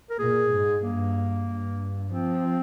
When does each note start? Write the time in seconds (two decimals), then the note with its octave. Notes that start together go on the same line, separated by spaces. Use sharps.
0.10 A#4
0.19 A#2 G#4
0.51 G#2
0.83 G2 A#3
1.49 G2
2.13 F3 C4